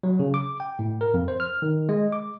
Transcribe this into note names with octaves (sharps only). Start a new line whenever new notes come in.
F#3
C#3
D6
G5
A2
A#4
F2
C5
F6
D#3
G#3
D6